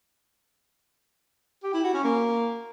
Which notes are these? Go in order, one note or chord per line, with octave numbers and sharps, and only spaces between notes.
G4
E4
F#4
C#4
A#3